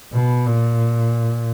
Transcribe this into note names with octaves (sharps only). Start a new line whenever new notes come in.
B2
A#2